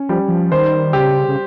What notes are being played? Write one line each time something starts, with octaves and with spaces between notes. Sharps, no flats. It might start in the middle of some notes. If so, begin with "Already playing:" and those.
Already playing: C#4
F3 G3
F3
D#3 C5
C#3 G4
C#3